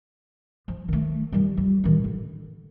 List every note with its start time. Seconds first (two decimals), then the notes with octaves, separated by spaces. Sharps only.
0.68 F3
0.88 D#3 A3
1.32 D#3 G3
1.57 G3 F4
1.84 A1 D#3
2.04 D3